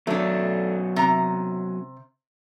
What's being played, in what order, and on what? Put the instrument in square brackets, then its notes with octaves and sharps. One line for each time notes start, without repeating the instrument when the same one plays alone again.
[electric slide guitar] F#3 B3 C#4 [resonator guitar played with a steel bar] A3 D4
[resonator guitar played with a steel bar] C3 A#5